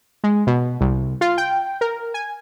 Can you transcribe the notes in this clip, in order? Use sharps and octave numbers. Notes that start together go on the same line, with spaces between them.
G#3
B2
C2
F4
G5
A#4
G#5